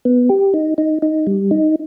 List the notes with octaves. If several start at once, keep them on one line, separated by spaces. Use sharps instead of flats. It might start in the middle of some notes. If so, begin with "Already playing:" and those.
B3
G4
D#4
D#4
D#4
G3
D#4